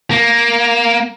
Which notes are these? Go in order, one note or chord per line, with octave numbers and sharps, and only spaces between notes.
A#3